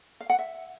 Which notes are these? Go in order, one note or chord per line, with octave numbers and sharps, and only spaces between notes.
F5
F#5
E5